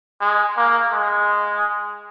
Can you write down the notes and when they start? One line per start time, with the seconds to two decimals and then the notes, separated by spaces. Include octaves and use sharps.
0.21 G#3
0.57 A#3
0.93 G#3